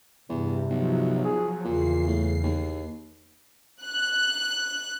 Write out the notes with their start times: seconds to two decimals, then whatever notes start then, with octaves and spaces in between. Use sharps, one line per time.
0.29 E2 G2 C3
0.70 B1 F3 F#3
1.25 G#4
1.64 E2 A#2 C#3 C7
2.07 A2
2.43 D#2
3.84 F#6